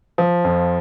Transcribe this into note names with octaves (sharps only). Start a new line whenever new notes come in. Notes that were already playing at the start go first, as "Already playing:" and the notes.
F3
F2